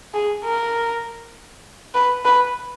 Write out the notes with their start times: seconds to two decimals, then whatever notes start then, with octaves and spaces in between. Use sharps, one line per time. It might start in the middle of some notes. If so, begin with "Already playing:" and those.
0.14 G#4
0.45 A#4
1.94 B4
2.25 B4